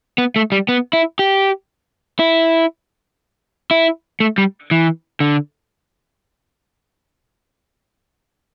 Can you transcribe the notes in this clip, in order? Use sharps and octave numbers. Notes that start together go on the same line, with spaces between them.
B3
A3
G3
B3
E4
G4
E4
E4
A3
G3
E3
D3